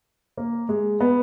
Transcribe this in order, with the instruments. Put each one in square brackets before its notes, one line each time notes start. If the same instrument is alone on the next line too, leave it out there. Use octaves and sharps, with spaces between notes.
[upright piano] A#3
G#3
B3